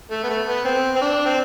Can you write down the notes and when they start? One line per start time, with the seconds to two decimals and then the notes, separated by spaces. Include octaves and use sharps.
0.11 A3
0.24 B3
0.29 A3
0.47 B3
0.65 C4
0.96 C4
1.01 D4
1.25 C4